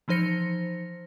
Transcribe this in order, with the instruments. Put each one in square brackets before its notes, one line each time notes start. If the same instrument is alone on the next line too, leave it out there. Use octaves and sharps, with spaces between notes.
[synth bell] E3 F3 D#4 C5 A#6 C#7